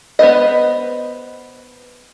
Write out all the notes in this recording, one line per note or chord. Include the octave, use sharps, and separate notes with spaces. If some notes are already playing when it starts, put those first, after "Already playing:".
B3 B4 C5 D#5